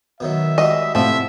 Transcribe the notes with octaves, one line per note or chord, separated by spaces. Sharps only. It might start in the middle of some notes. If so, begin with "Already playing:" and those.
B2 D#3 F#3 E5
G3 G#3 F#4 D#5
A2 C3 F3 F#4 C5 E5